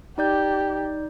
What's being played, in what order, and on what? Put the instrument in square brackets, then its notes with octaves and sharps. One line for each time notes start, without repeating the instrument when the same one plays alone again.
[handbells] D#4 D5 G6 [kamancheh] G4